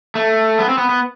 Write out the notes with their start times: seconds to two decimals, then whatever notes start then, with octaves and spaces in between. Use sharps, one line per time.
0.15 A3
0.59 B3
0.69 C4
0.78 B3
0.89 B3